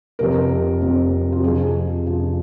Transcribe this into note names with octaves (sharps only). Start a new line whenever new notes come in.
F1 F2 C3 A#4
F1 F2 C3
F4
F2 C3 F3 G#4
F2 C3 F3